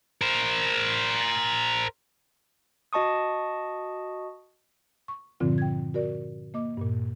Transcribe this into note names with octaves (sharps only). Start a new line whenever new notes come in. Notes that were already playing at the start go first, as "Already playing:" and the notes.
A#4 C5
F#4 D#5 A5 C#6 D#6
C#6
G2 A#2 D3 F3 C4 F4
G5 G#6
F#4 A#4 D5
A#3 D#5 D6
G2 A#2